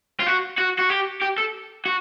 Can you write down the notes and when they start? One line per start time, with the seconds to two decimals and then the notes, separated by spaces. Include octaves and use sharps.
0.20 F4
0.26 F#4
0.58 F#4
0.79 F#4
0.90 G4
1.22 G4
1.38 A4
1.85 F#4